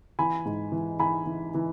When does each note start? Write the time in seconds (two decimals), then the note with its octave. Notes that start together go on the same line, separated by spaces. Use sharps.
0.19 E3 G#5 B5
0.45 G#2
0.72 E3
0.99 E3 G#5 B5
1.26 E3
1.54 E3